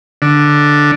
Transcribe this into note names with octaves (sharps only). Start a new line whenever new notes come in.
D3